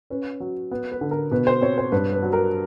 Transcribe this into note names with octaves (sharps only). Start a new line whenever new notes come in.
C#4 B4
F#3
B3
B4
D3
A#4
B2 B4
C5
C4 C#5
C5
G2 B4
B4
F#3
A#4